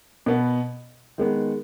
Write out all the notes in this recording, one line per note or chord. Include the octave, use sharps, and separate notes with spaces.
B2 B3
D#3 G#3 B3